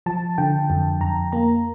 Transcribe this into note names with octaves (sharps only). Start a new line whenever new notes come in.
F3 A5
D3 G5
F2
F2 A#5
A#3 A#5